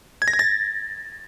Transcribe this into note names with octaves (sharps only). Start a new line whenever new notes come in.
G#6
A#6
G#6
A6